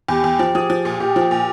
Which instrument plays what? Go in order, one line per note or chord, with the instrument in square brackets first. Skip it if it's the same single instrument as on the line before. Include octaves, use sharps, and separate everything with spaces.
[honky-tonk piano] E2 [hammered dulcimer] G4
[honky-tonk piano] E2
F3
[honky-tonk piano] F3 [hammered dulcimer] G#4
[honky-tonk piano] F3
A#2
[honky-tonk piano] A#2 [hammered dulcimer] G4
[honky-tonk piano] F3
A#2